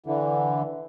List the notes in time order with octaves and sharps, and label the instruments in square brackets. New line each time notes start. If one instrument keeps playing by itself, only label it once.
[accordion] D3 E3